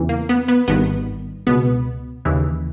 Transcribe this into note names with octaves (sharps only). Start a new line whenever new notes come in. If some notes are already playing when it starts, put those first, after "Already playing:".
Already playing: E2 C#3 E3
A#3
B3
B3
G#1 G2 D#3 B3
C#2 B2 B3
D#2 C#3 E3